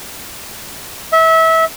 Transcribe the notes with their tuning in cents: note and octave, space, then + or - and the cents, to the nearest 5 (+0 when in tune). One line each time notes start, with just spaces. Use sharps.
E5 -25